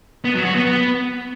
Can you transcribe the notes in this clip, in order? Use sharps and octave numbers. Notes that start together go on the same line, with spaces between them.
B3
F#3
F#4
B3
B3